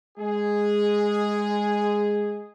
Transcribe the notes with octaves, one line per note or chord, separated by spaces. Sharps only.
G#3 G#4